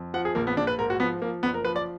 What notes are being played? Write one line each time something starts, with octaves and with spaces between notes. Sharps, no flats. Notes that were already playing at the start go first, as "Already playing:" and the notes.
Already playing: F2
F3 F#5
G#4
A#1 A#3
B3
A#1 D4
B4
G#2 A#4
F#4
F3 B3
F3 A#3
F#1 B3
A#4
F3 B4
D5